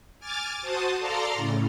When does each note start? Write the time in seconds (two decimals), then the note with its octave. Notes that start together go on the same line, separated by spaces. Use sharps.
0.20 G#5 D6 F6 A6
0.61 F#4 C5 A5 D#6
0.99 A4 D5 F5 A#5 C6 F6
1.35 A2 C#3